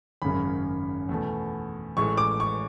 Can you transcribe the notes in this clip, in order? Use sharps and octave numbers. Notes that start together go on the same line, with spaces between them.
G#1 F#2 C#3 G#3 B5
E2 B2 A3
A1 A2 G#3 C#6
D6
C#6